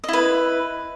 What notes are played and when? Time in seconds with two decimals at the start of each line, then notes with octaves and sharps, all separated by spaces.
0.04 D#5
0.08 E4
0.13 B4